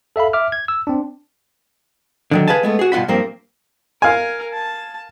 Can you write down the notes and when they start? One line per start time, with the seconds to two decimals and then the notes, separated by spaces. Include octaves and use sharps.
0.16 A4 E5 F5 B5
0.33 E5 D6 F6
0.52 G#6
0.68 E6
0.87 C4 D4
2.31 D3 D#3 F#3
2.48 G#4 B4 F5 G#5 A5
2.63 G#3 A3 B3
2.79 F#4 G#4
2.92 G2 B2 F4 F#5 B5
3.08 G2 F3 A#3 C4
4.02 A#4 F5 G#5
4.54 A5